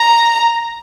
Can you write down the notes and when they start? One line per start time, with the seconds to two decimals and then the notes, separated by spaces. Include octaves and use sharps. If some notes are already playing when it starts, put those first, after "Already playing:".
Already playing: A#5